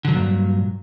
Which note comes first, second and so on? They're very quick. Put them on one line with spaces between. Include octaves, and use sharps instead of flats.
D3 F#3 E2 A#2 G2